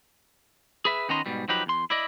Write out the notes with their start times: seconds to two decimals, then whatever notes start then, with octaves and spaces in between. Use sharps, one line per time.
0.85 G#4 B4 E5
1.09 D#3 B3 C#4 D#5 A#5 C6
1.26 G#2 B2 G3
1.48 F3 F#3 D#4 G4 B4
1.66 E2 C6
1.90 E4 D5 D#5